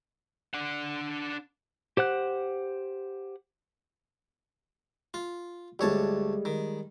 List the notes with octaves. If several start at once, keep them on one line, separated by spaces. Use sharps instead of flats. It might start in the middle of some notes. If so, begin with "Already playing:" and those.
D4 F#5
G4 C5 F#5 F#6
F4
D2 G3 G#3 C#5 A5
D#3